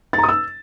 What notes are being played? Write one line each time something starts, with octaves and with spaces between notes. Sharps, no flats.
A6
A#5
D#6
E6